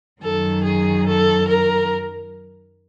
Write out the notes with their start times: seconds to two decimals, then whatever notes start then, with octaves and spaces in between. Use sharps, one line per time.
0.22 F#2 D#3 F#3 A4
0.64 G#4
1.06 A4
1.48 A#4